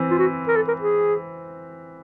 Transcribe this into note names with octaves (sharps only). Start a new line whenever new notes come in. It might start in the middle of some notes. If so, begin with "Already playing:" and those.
Already playing: E3 C4
F4
F#4
A#4
A4
A#4
G#4